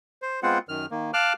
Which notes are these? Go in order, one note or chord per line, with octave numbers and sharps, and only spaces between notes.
C5
G#3 B3 C4 F4 C5 F#5
F#2 D#3 F6
D#3 A#3
F5 A5 D6 F6 F#6